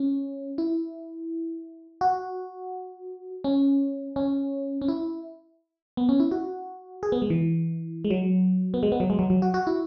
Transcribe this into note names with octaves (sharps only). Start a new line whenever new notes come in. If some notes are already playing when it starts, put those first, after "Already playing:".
Already playing: C#4
E4
F#4
C#4
C#4
C#4
E4
B3
C#4
E4
F#4
G#4
B3
G#3
E3
G#3
F#3
B3
G#3
B3
F#3
G#3
F#3
F#3
F#4
F#4
E4